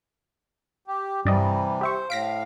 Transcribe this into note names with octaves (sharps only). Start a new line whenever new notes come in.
G4
G2 C3 E3 G3 D5 D#5
G4 C5 E5 C#6
A2 F5 A#6 B6 D7